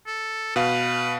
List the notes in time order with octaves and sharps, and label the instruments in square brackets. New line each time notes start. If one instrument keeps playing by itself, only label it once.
[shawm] A4
[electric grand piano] B2 F5 [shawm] B4